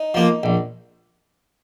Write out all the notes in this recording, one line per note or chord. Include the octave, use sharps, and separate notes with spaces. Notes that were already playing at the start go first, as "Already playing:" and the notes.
Already playing: D#4
F3 A#3
A#1